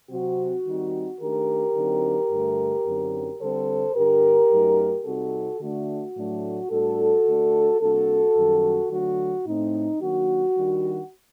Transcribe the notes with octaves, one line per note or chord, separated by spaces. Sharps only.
C3 F#3 C4 F#4
D#3 G3 C4 D#4
D#3 A3 D4 G4 A#4
D3 F#3 C4 D#4
G2 D3 A3
F#2 D3 F#3 C4 D#4
D3 G3 C4 A4 C5
G2 D3 G3 D4 G4 A#4
F#2 F#3 A3 D#4
C3 G3 C4 D#4 F#4 A4
D3 A3 D4 F#4
A2 F#3 A3 D4
A2 G3 D4 F#4 A4
D3 A3 D4
C3 G3 A#3 D4 F#4 A4
F#2 D#3 G3
D3 F#3 A3 F#4
A2 A3 C4 D#4
D#3 F#3 A#3 D4 F#4
D#3 G3 D4